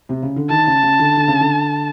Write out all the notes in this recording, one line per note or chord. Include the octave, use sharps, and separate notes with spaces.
C3
C#3
D3
D#3 A5
C#3
C#3
D3
D3
C#3
D3